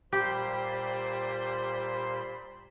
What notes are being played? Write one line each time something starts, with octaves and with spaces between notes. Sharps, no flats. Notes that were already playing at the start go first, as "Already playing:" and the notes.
A#2 G3 G4 C5 B5 C6